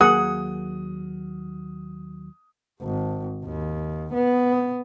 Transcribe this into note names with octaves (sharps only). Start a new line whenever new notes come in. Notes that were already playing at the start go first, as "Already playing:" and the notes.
D#2 F#3 A#3 G#4 F#5 D#6
G#1
D#2
B3